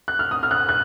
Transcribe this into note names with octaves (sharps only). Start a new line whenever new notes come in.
F#6
F6
D#6
F6
F#6
F#6